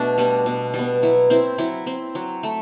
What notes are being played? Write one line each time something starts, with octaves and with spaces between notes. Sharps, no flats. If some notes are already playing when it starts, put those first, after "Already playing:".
Already playing: B2 A3 D4 F#4
G3 B3
B2
G3
B3
F#3 E4
C4 E4
F#3 E4
C4
F#3
A3